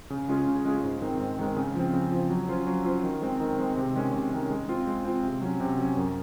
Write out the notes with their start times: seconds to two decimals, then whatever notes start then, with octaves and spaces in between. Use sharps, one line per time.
0.10 C#3
0.28 G#3 C#4 F4 G#4
0.47 C#3
0.65 G#3 C#4 F4 G#4
0.83 G#2
1.02 D#3 G#3 C4
1.20 G#2
1.39 D#3 G#3 C4
1.56 C#3
1.75 F3 C4
1.93 C#3
2.12 F3 C4
2.30 F#3
2.48 C#4 F4 C5
2.67 F#3
2.85 C#4 F4 C5
3.03 D#3
3.22 G#3 C4
3.40 D#3
3.58 G#3 C4
3.77 C3
3.95 D#3 G#3 C#4
4.13 C3
4.32 D#3 G#3 C#4
4.50 G#3
4.69 C4 F4
4.87 G#3
5.05 C4 F4
5.23 C3
5.42 F#3 C#4
5.60 C3
5.78 F#3 C#4
5.97 F#2